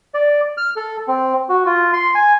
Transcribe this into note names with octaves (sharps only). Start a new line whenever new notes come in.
D5
F6
A4
C4
F#4
F4
C6
G#5